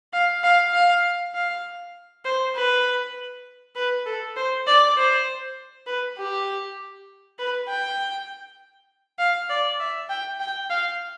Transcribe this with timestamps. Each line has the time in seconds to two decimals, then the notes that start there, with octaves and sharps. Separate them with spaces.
0.13 F5
0.43 F5
0.73 F5
1.34 F5
2.25 C5
2.55 B4
3.75 B4
4.06 A4
4.36 C5
4.67 D5
4.97 C5
5.86 B4
6.18 G4
7.39 B4
7.68 G5
9.19 F5
9.49 D5
9.80 E5
10.10 G5
10.40 G5
10.70 F5